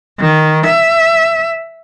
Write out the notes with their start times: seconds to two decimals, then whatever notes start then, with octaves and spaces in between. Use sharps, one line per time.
0.20 D#3
0.66 E5